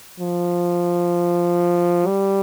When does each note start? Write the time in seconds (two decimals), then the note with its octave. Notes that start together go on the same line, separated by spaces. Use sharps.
0.20 F3
2.07 G3